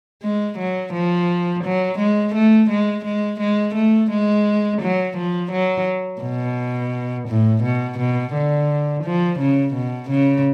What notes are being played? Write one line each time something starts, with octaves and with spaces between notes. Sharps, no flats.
G#3
F#3
F3
F#3
G#3
A3
G#3
G#3
G#3
A3
G#3
F#3
F3
F#3
B2
A2
B2
B2
D3
F3
C#3
B2
C#3